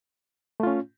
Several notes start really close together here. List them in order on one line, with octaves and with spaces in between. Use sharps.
A3 F4 C#4